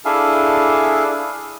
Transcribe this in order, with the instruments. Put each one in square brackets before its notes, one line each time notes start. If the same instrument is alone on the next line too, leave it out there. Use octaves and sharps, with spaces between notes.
[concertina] D4 E4 G#4 A4 F5